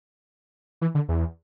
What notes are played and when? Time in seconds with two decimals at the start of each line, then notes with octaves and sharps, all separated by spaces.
0.81 E3
0.95 D3
1.09 E2